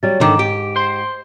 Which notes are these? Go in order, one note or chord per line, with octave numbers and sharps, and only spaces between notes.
F#3 G3 A6
G#2 D3 D#3 A#5 D6 E7
G4 D7
C5 C6